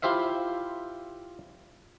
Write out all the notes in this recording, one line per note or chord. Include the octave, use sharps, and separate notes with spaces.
E4 F4 G4 C5 E5 F5